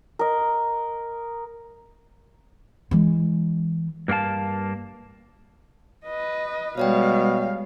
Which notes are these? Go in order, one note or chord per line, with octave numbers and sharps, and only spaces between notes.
A#4 D#5
E3 G#3
G2 A#3 D#4 F5 A5
B4 D#5
B2 G3 G#3 C#5 D5 F5 G5